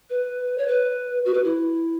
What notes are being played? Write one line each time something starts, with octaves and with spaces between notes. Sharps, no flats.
B4
C#5
B4
F#4
B4
E4